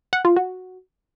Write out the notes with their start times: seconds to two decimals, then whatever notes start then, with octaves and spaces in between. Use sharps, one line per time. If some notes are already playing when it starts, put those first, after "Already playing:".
0.13 F#5
0.25 F4
0.36 F#4